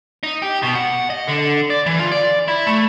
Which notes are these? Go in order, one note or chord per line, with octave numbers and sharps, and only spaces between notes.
D#4
G4
B2
F#5
D#5
D3
D5
E3
F4
D5
E4
A3